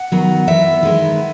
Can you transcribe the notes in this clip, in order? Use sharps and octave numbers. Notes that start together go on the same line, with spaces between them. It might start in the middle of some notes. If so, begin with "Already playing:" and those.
Already playing: F#5
D#3 F#3 B3
E3 B3 E5
D#3 G#3 B3